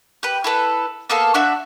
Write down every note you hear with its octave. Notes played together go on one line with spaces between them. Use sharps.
G4 B4
E4 A4 B4
A#3 B3 A4 F5
D4 F#4 E5